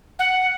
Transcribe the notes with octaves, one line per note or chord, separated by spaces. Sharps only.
F#5